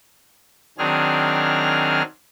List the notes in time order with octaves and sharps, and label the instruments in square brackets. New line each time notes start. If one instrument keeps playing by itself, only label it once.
[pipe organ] D#3 F#3 C4 D4 G#4 F6